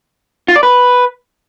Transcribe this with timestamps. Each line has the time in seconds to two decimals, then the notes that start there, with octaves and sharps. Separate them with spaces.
0.48 F4
0.56 D5
0.63 B4